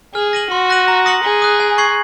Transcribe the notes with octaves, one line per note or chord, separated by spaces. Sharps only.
G#4 F6
A#6 D#7 F#7
F#4 C6
F#6 A#6 D#7 F#7
A#5
D#6 A#6 C#7 F#7
G#4 A#5
D#6 F#6
G#5
C#6 G#6 C7 F#7